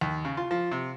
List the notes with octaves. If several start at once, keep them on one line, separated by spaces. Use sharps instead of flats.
D#2
C#3
F4
F3
C3